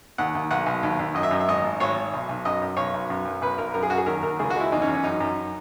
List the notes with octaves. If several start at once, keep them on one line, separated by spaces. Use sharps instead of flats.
D#2 F#5
D#2
B1 F#5
B1
D#2
D#2
F#2 D#5
E5
F#2 D#5
E5
G#1 D#5
G#1
G#1 C#5
G#1
B1
B1
F#2 D#5
F#2
B1 C#5
B1
F#2
F#2
B1 B4
B1 A#4
F#2 A#4
G#4
F#2 F#4
G#4
D#2 A#4
D#2 A#4
C#2 G#4
F#4
G#3 E4
E2 D#4
C#4
E2
C#4
F#2 D#4
F#2